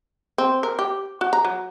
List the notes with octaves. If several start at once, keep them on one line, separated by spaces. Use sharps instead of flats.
C4
A#4
G4
F#4
A#5
F#3